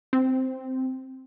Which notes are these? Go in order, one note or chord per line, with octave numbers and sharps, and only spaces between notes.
C4